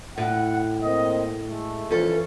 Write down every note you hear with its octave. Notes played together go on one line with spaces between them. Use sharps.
A2 F#5
A#3 C4 D#5
G#3 A3
F2 E3 C#4 A4